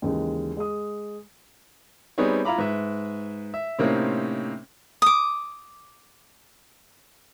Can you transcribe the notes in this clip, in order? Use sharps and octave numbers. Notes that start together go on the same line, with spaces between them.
D#2 C#3 E3 G#3
G#3 D#6
G3 B3 C4 D#4 G#4 C#5
E4 F4 F5 A#5 B5 D6
G#2 B4 E5
E5
A2 C3 A#3 C4 C#4 D#4
D6 D#6